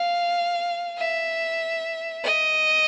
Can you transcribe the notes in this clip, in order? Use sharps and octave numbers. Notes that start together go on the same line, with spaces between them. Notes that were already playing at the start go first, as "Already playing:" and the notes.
Already playing: F5
E5
D#5